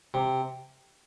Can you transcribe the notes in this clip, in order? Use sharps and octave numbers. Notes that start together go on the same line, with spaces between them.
C3